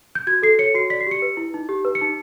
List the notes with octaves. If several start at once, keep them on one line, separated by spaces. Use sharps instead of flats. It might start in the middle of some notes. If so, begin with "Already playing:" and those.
G6
F#4 G#6
A4 C7
C#5 C#7
F#4 C7
D5 B6
C7
G4 C#7
B4
E4
D#4
G4
B4
C#7
D#4